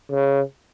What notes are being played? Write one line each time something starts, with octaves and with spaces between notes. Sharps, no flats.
C#3